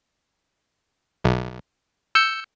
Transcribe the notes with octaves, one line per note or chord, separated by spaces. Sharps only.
B1
E6 G6 C#7